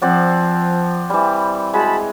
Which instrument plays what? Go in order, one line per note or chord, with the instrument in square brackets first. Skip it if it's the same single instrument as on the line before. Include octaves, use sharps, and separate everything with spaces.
[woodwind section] F3 [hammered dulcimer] C4 D5 F#5
[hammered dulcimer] E3 G3
[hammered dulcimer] G#3 [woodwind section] F#4 A5 B5